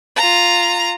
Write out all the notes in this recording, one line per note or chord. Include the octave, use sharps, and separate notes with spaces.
F4 A#5